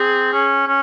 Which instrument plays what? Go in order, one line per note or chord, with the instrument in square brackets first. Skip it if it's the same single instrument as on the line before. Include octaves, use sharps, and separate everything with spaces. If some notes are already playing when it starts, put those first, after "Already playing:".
Already playing: [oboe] C4 [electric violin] G#4
[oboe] C#4
C#4